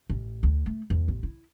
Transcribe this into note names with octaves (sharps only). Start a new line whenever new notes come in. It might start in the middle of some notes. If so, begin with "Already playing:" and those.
A1
D2
A3
E2
A1
E4